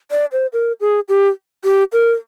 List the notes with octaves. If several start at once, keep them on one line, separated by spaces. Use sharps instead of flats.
D5
C5
A#4
G#4
G4
G4
A#4